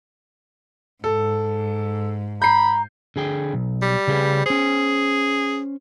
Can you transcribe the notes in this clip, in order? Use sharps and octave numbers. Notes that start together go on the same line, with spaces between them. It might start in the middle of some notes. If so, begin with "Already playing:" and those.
G#2 A4
A#5 B5 G6 C7
D3 G#4 G5
B1
G3
C#3 G#4 B4
C#4 G#4 C5